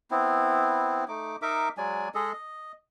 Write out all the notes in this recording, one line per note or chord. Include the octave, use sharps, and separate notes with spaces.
B3 C4 E4
A3 D#4 D6
D#4 A#4 E5 D6
F#3 G#3 D5 G#5
G#3 G#4 A4 D#5
D#5